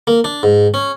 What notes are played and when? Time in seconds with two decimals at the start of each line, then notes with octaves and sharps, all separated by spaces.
0.07 A#3
0.24 D4
0.43 G#2
0.74 C#4